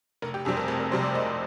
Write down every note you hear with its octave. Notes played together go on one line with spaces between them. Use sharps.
F1 A#4
G4
F2 C3 G3 C4 G#4
A#4
F1 A#4
A#4
F2 C3 G3 C4 C5
D5
F1 D#5